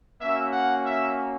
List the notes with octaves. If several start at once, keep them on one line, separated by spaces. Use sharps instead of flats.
A#3 C#4 F#4 E5
F#5
E5